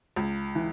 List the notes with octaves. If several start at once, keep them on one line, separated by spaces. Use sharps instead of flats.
C#2
E3